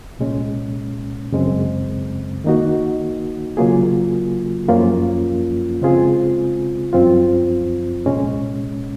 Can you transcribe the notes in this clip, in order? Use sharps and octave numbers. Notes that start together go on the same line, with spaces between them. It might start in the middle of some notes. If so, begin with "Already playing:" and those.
C2 A#2 G#3 C#4
F#2 C#3 G#3 C4
D#3 A#3 D#4 F#4
C#3 F#3 A#3 F4 G#4
F#2 F3 A#3 C#4 F4
C#3 G#3 C4 F4 G#4
F#2 F3 C4 F4
C2 A#2 G#3 C#4